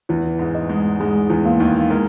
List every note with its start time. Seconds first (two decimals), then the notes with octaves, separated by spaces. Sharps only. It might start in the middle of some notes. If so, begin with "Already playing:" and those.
0.09 E2 E3 B4
0.39 G#2 G#3
0.55 D#5
0.69 G#2 G#3
1.00 G#2 G#3 G#4
1.30 E2 E3
1.45 A#3
1.60 D#2 D#3
1.90 G#3 A#4